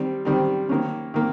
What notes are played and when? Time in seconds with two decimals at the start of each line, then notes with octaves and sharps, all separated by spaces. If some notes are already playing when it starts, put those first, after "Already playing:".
Already playing: D#3 G3 C4
0.25 D#3 G3 C4
0.69 D#3 A#3 C#4
1.14 D#3 A#3